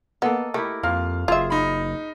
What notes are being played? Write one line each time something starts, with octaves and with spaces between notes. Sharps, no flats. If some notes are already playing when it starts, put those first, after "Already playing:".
A#3 B3 A4 D#5
A3 E4 G4 A#4
F2 A#3 F4 F5 F6
F#1 F4 G#4 E5
D#4 B5